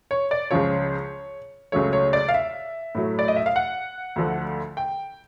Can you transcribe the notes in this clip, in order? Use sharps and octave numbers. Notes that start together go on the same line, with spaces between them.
C#5
D5
C#2 C#3 F3 C#5
C#2 C#3 F#3 A3 C#5
C#5
D5
F5
E5
A2 F#3 A3
D5
D#5
E5
F5
F#5
D2 D3 F3 A3
G5